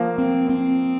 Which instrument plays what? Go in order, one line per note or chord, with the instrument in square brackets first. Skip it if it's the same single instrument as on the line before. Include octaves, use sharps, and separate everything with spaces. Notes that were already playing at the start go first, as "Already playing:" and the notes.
Already playing: [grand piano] F3 A#3
[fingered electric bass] C4
C4